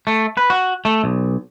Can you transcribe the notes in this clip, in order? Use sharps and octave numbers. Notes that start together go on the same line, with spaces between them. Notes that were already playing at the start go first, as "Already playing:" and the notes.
A3
B4
F#4
A3
B1